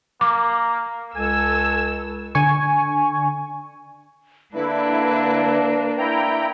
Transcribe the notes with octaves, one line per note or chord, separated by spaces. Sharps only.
A#3 D6
C#2 A4 G#5 E6
D3 G#5 C#6
D3 A#3 D4 E4 B4
E4 G5 A#5